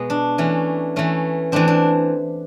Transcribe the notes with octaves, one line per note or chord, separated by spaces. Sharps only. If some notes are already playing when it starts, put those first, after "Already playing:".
Already playing: B2 G#3 B3
D4
E3 A3 C#4
E3 A3 C#4
E3 A3 C4 D4
D4